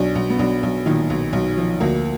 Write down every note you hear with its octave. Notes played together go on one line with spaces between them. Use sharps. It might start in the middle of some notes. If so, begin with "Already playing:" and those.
Already playing: B1 D4
B1
B3
B1 D4
B1
A#2 D#3 D#4
B1
B1
F3
D2 A#3 A#4